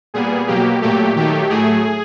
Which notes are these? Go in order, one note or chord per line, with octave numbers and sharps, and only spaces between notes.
A#2 G3 B3 G#4
B2 F#3 A#3 G4
A#2 F#3 A3 G4
D#3 F#3 A3 G4
A2 F#3 A3 G#4